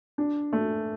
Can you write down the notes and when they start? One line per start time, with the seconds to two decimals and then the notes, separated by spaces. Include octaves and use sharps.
0.18 D4
0.53 A3